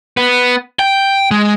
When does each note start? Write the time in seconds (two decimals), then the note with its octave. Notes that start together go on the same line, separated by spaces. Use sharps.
0.17 B3
0.79 G5
1.31 G#3